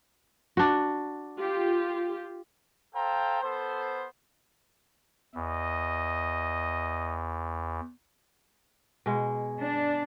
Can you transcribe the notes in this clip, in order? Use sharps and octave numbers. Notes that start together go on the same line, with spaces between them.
D4 F#4
F4 G4
A4 C5 F5 G5 A#5
B3 A4 C5
E2 D#5
B2 G#3
D4